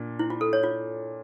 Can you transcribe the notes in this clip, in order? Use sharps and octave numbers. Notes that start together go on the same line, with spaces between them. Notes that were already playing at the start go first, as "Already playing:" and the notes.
Already playing: A#2 D4
E4
F4
A4
C#5
F4